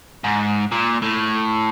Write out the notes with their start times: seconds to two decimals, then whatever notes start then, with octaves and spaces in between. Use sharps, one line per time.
0.24 G#2
0.72 A#2
1.02 A2